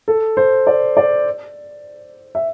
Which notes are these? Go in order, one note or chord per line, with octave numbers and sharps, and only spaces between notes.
A4
C5
D5
D5
E5